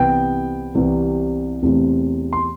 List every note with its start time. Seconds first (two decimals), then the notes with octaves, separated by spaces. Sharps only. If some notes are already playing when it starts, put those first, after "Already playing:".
Already playing: C2 C3 E3 B3 G5
0.75 C2 C3 E3 B3
1.62 E2 C3 E3 A3 C4
2.33 C6